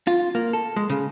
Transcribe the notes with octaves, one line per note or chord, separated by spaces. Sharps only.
F4
A#3
A4
G#3
C#3